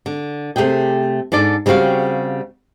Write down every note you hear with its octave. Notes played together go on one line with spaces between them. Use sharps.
D3
C3 A3 G4 G#4 G5
G#2 D4 A4 D5
C#3 G3 C4 F#4 F5